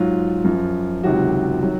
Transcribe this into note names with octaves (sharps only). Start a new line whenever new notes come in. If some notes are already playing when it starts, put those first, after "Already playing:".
Already playing: G#2 F#3 F4
F#2 F3
C#2 C3 D#3 F#3 F#4
D#3 F#3